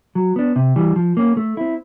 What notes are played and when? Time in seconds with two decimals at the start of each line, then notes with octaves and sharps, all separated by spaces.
0.15 F#3
0.36 B3 D4
0.56 C3
0.76 E3 G3
0.96 F3
1.17 A#3 C#4
1.37 A3
1.57 C4 E4